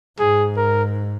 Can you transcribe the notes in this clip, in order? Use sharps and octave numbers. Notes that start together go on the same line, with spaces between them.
G#2 G#4
A#4